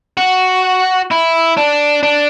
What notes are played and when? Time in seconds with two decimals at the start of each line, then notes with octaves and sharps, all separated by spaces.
0.18 F#4
1.11 E4
1.57 D4
2.03 D4